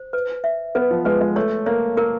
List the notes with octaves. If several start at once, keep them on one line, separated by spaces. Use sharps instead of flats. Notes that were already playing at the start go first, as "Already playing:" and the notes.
Already playing: C5
B4
E5
B3 B4
F3
G#3 B4
G#3
A3 C#5
A#3 C#5
A#3 A#4